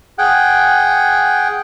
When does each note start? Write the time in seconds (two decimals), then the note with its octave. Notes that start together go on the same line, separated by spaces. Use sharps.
0.18 G#4 F#5 G5